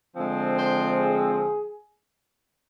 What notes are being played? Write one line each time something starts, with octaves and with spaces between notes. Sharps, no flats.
D3 F3 G#3 C4
C5
G#4